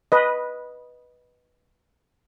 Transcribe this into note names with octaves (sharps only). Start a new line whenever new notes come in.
B4 D#5